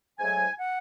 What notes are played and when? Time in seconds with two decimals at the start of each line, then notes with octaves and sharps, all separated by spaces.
0.18 G#2 F#3 A3 G#5
0.58 F#5